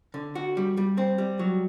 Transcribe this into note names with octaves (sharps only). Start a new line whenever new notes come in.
D3
F#4
G3
G3
C4
G3
F#3